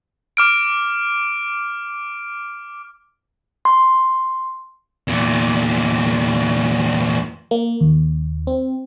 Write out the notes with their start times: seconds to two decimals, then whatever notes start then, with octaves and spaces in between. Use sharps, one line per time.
0.37 D6 F6 D7
3.65 C6
5.08 E2 A#2
7.51 A#3
7.81 D#2
8.47 C4